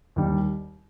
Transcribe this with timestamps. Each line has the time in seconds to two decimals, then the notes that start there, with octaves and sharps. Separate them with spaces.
0.16 D#2 D#3 G3